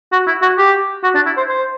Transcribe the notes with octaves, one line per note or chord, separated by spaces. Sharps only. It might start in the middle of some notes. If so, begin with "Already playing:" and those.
F#4
E4
F#4
G4
F#4
D4
E4
C5
C5